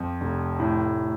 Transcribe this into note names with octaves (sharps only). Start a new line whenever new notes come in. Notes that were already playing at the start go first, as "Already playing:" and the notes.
Already playing: F2
F1
A2